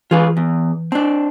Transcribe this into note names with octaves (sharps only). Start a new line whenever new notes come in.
E3 F4 G#4 B4
E2
C4 D4 A5